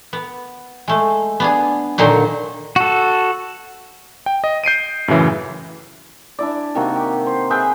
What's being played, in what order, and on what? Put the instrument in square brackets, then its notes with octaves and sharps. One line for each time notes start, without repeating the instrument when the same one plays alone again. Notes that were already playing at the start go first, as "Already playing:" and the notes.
[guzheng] B3
G#3 A3
B3 D4 G#4
A#2 D3 D#3 F#3 D#4 C6
[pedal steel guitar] F#4 A4
[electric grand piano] G5
D#5
G6 C7 D7 D#7
F#2 A2 C#3 E3
[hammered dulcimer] D4 E4 D5
C3 D#3 A#3 F#4
G4
C5
G#4 B4 E5 G5